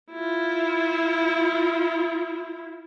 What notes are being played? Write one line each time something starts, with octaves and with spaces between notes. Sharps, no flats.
E4 F4